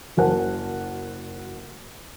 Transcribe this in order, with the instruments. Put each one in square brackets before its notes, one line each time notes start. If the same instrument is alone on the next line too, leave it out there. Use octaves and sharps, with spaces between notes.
[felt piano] F#1 F#4 A#4 C5 F#5 A5